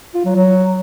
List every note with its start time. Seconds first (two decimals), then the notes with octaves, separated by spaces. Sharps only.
0.14 F4
0.25 F#3
0.35 F#3